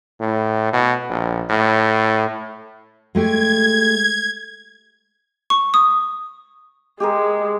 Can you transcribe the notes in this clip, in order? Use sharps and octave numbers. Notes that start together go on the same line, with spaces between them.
A2
B2
A#1
A2
G#3 A3 G4 G#6
C#6
D#6
G#3 G4 G#4 A#4